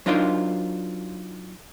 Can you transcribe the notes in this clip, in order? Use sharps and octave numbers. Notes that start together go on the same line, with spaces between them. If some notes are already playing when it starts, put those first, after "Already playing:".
F#3 D4 D#4 F4 A#4 C5